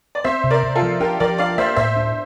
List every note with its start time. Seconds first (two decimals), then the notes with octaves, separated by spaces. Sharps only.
0.15 D5
0.24 C4 C5 E5
0.44 C3
0.50 A#4 D5
0.63 C3
0.75 F4 A4
0.82 F3
1.00 D4 G4 A#4
1.20 F3 A#4 D5
1.38 D4 D5 F5
1.58 A#3 C5 E5
1.76 A2 C5 E5
1.96 D4